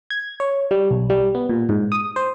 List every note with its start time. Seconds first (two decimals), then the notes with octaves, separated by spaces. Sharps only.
0.10 G#6
0.40 C#5
0.71 G3
0.91 B1
1.10 G3
1.35 B3
1.49 A#2
1.69 G#2
1.92 D#6
2.16 C5